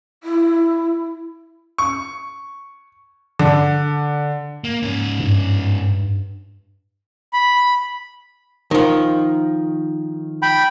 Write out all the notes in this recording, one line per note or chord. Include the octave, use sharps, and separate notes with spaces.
E4
C#6
D3
A#3
G#2 C#4
G2
B5
D#3 F3
G5 B5